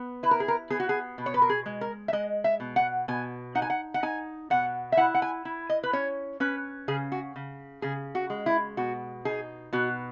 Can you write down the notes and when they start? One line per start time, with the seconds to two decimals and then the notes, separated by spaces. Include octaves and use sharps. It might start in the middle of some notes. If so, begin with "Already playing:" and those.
Already playing: B3
0.23 E4 B4
0.31 A#4
0.40 G#4
0.48 A#4
0.70 B3 G#4
0.80 F#4
0.89 G#4
1.18 B2
1.26 C#5
1.34 B4
1.42 A#4
1.50 G#4
1.66 G#3
1.81 A#4
2.08 E5
2.13 G#3 D#5
2.44 E5
2.60 B2
2.76 F#5
3.08 B2 G#5
3.55 D#4 F#5
3.62 G#5
3.70 F#5
3.94 F#5
4.03 D#4 G#5
4.50 B2 F#5
4.92 E5
4.97 E4 F#5
5.15 F#5
5.22 G#5
5.45 E4
5.70 D#5
5.84 B4
5.93 C#4 C#5
6.40 C#4 B4
6.88 C#3 G#4
7.12 F#4
7.36 C#3
7.82 C#3 G#4
8.15 F#4
8.30 G#3
8.46 E4
8.77 B2 F#4
9.25 D#4 G#4
9.73 B2 F#4